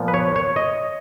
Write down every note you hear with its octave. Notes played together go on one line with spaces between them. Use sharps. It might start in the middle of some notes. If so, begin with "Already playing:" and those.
Already playing: A#2 F3 B3
B4
C#5
C#5
D#5